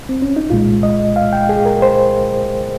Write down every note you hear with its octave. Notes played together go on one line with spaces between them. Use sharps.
C4
C#4
D#4
C2 A#2 G#3 F4
D#5
F5
G5
G#4
A#4
C5